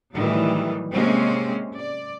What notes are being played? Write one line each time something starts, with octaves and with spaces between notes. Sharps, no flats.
A2 D#3 E3 F#3 G3
C3 G#3 A#3 C4 C#4
D5